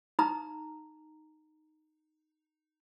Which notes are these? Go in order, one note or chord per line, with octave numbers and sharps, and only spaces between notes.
D#4 A#5